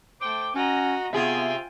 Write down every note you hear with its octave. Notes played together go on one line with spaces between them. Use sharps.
A3 C5 G5 D6
C#4 F#4 D#5 A#5
C3 B3 F4 G#4 E5 G5 G#5